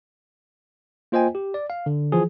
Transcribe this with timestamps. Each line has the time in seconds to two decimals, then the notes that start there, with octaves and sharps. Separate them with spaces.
1.12 A#3 F4 C5 D#5 G5 G#5
1.35 G4
1.54 D5
1.70 F5
1.86 D3
2.12 E3 F3 G#4